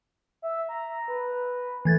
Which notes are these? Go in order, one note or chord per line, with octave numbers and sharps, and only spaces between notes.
E5
A#5
B4
E3 A3 G#6 A6